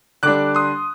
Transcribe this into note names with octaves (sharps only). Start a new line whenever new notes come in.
D3 G3 D4 D6 F#6
C6 D#6